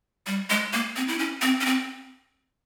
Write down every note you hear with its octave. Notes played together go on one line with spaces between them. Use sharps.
G3
G#3
A#3
C4
E4
C#4
C4
C#4
C4